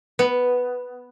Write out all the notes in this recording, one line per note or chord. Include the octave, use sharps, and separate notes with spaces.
B3